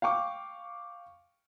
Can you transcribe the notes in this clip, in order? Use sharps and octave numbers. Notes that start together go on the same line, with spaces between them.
F5 G5 C#6 D6